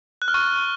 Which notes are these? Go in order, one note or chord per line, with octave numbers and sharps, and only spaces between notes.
F#6
F6
C#6